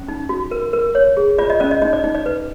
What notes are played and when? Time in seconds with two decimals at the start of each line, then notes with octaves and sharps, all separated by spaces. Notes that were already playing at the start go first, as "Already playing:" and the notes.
Already playing: C#4
0.08 D#4
0.29 F#4
0.51 A#4
0.73 A#4
0.95 C#5
1.17 G#4
1.38 F4 D5
1.50 D#5
1.60 C#4 D5
1.71 D#5
1.82 D#4 D#5
1.93 D5
2.04 D#4
2.15 D5
2.26 B4